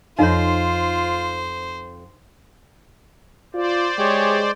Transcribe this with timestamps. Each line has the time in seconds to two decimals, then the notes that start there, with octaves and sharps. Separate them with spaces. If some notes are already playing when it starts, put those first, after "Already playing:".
0.19 F2 D#4 F4 C5 C#5 D#5 F5
3.54 F4 C5 D5
3.98 G#3 G4 G#4 C#5